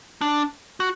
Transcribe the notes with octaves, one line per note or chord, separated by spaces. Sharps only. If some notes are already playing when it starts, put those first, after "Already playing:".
D4
F#4